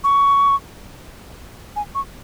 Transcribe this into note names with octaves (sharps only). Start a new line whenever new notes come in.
C#6
G#5
C#6